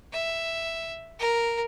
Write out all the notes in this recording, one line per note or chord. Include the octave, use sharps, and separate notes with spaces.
E5
A#4